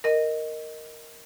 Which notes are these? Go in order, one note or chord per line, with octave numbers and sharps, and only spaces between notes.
A#4 D#5